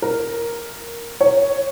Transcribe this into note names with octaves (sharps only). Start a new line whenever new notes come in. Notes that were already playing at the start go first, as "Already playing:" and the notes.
A#4
C#5